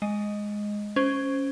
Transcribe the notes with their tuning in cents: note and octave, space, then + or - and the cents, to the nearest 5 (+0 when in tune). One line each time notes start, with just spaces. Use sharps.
G#3 +0 D#5 +0
C#4 +0 C5 +0